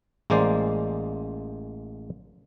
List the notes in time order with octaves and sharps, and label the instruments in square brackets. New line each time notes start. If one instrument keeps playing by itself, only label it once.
[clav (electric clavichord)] A1 G#3 A#3 C5 D5